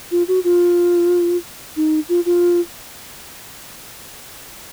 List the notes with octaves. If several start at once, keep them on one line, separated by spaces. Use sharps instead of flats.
F4
F#4
F4
D#4
F4
F4